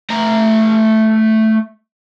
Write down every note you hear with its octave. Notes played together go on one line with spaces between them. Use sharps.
A3 A#5